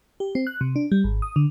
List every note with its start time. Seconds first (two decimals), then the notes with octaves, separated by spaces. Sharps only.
0.20 G4
0.35 C4
0.47 F#6
0.61 C3
0.76 D4
0.92 G3
1.04 G#1
1.22 D#6
1.36 D3